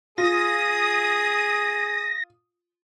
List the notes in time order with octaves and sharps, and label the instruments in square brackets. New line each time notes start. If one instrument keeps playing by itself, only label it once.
[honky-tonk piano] F4 [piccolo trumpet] G#4 [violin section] D#6 [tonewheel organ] A#6